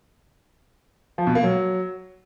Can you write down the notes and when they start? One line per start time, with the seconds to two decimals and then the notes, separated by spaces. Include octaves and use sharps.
1.18 F3
1.27 B2
1.35 A#3
1.44 F#3